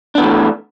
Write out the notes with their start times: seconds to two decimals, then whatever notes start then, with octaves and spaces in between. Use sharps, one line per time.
0.15 D4
0.18 B3
0.21 E3
0.24 A3